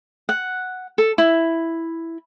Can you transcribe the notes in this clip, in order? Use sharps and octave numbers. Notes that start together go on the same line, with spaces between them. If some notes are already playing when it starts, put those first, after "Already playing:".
F#5
A4
E4